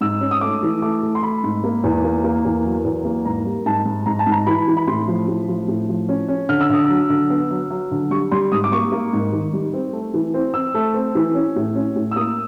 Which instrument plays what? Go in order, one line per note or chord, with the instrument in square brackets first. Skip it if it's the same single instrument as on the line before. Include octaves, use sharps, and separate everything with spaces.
[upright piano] G#2 E6
C#4
D#6
A3 D6
E3
A3 D6
A3
C6
A3 B5
G#2
A#3
E2
A#3
A#3
E2
F#3
E2
A#3
G#2 A#5
G3
G#2 A5
G#2
G#2 A#5
A5
G#2
A#5
E3 B5
E3
B5
A2 C6
F3
A2
F3
A2
F3
C#4
C#4
D3 F6
E6
D3 D#6
F#3 E6
D3
B3
F#3
F#3
D3
G3 C#6
G3 C6
G#2 D#6
D6
A#3 C#6
A#3
G#2
D#3
G3
C4
A3
E3
C4
C4 E6
A3
C4
E3
C#4
A2
C#4
A2
E6
A#3 D#6